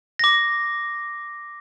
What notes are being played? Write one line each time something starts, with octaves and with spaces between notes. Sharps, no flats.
D6 A#6